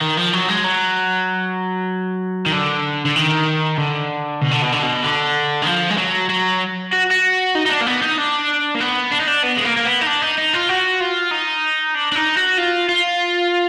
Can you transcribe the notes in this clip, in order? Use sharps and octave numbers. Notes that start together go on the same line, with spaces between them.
D#3
F3
F#3
G#3
F#3
D#3
D3
D3
D#3
D3
B2
D3
B2
D3
B2
D3
D#3
F3
G#3
F#3
F#3
F#4
F#4
D#4
D#4
D4
A#3
B3
D#4
D4
A#3
B3
D4
D#4
D4
B3
G#3
A#3
A#3
B3
D#4
D4
D#4
D#4
F4
F#4
F4
D#4
D4
D4
D#4
F#4
F4
F4